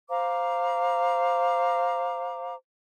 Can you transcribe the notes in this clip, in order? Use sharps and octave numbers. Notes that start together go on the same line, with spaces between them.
C5 F5 A#5 D6